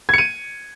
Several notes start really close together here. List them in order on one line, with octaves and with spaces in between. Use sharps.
G#6 C#7 D#7